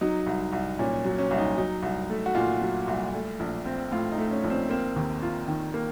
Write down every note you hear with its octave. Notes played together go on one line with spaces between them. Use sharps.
F#3 D#4
C2
C2
A#2 C#4
F#3
C#4
C2
D#4
F#3 D#4
C2
A3
F#4
A#2 F4
F#3
C2
A3
A#1
C4
A2 F4
D#4
A3
C#4
A#1
C4
A#3 C4
D#2
F4
D#3
A#3